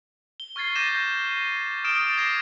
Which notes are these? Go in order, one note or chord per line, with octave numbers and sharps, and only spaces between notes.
G7
C#6 F6 G#6 A6 C7
D6 G6 A#6 D#7 E7
D#6 F6 A6 D7 E7
D6 G#6 A#6 C7 E7